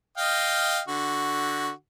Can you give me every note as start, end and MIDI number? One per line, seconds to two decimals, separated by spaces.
0.17 0.81 75
0.17 0.81 77
0.17 0.81 79
0.88 1.71 50
0.88 1.71 66